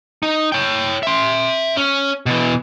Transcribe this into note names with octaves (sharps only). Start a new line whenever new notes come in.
D#4
C#5 G5
E5 C6
C#4
B2 E3